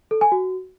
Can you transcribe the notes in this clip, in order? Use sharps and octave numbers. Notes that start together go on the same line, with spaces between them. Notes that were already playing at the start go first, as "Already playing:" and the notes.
A4
G#5
F#4